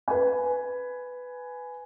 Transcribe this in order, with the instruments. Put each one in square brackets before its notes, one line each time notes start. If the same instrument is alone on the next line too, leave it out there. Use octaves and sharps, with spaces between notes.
[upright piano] B4 G#5